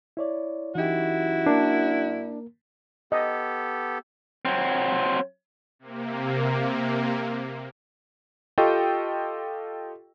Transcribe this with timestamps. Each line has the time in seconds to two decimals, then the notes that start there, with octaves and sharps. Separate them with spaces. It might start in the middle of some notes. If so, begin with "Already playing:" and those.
0.17 E4 C#5 D5
0.75 F#2 E3 D#4 E4 F#4 G4
1.46 A#3 D4 A#4
3.12 B3 G4 A4 D#5
4.45 F#3 C4
5.79 C3 A#3
8.58 F4 G4 A4 D#5 G5 C#6